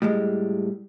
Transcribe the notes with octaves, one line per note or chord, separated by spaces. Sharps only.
A2 G3 G#3